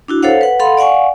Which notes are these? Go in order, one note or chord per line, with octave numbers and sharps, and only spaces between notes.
D4 E4 F#4
A4 C5 C#5 F5 F#5
B4 F#5
A4 F5 F#5 B5 C6
D5 F5 F#5 G#5 C#6